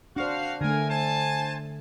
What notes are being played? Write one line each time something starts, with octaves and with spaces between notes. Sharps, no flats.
D4 F#4 C5 F5
D3 A3 A#4 G#5
C5 G#5 A5